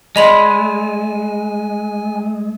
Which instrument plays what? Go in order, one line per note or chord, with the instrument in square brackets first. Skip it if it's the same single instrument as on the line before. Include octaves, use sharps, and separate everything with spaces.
[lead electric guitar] G#3 [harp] D5 B5 C6 [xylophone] D#5 F7 F#7 [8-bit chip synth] G#5